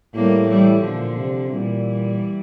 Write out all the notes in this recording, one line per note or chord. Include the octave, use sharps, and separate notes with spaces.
A2 G3 A#3
E3 G3
A#2 D3 F3
C3
A#2 E3 G3